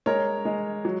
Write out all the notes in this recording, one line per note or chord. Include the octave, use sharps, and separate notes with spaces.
G#3 A#4 C#5
G#3
F#3